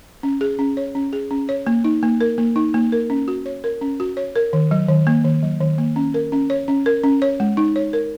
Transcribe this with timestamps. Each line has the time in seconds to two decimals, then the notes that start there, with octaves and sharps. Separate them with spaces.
0.23 C#4
0.41 G#4
0.59 C#4
0.77 C#5
0.95 C#4
1.13 G#4
1.31 C#4
1.49 C#5
1.67 A#3
1.84 D#4
2.03 A#3
2.21 A#4
2.38 A#3
2.56 D#4
2.74 A#3
2.92 A#4
3.10 C#4
3.28 F#4
3.46 C#5
3.64 A#4
3.81 C#4
4.00 F#4
4.17 C#5
4.36 A#4
4.53 D#3
4.71 F#3
4.88 D#3
5.07 A#3
5.25 D#3
5.43 F#3
5.61 D#3
5.78 A#3
5.96 C#4
6.14 A#4
6.32 C#4
6.50 C#5
6.68 C#4
6.86 A#4
7.04 C#4
7.22 C#5
7.40 G#3
7.57 D#4
7.76 C#5
7.93 A#4